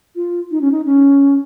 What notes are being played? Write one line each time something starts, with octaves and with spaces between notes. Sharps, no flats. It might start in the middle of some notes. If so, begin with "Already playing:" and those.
F4
D#4
C#4
D#4
C#4